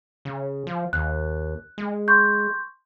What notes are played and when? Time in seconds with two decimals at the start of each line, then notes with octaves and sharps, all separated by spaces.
0.25 C#3
0.67 F3
0.93 D#2 F#6
1.78 G#3
2.08 C6 C#6 G6